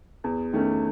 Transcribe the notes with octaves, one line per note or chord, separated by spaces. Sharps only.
E2
D#3 A3 C#4